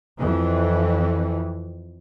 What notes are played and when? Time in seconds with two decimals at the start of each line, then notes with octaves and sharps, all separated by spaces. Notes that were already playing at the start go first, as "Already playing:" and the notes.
0.19 F2 E3